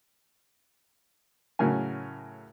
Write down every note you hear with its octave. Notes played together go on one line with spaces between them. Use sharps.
A2 C#3 F#3 A#4 G#5